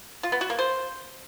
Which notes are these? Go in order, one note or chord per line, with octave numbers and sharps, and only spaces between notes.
F4
B3
F#4
A#3
C5